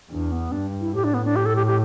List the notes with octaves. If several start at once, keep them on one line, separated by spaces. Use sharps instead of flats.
E2 D4
B3
G2 D4
E4
A2 G4
D4
B3
D4
G4
A4
G4
G4